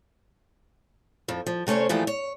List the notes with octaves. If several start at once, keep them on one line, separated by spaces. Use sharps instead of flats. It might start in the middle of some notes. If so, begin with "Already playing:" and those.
F2 F3
F3
C3 A3 C#4 C5 C#5
A#2 E3 F3 A3 G4 G#4
C#5